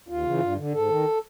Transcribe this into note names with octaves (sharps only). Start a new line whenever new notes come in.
D#2 F4
C#3 E3
G2
D3
G#2 A4
D#3